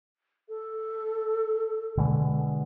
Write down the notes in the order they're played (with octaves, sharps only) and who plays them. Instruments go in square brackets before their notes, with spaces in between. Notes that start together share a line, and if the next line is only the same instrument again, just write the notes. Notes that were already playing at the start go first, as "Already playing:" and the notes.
[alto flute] A4
[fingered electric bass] B2 D3 G#3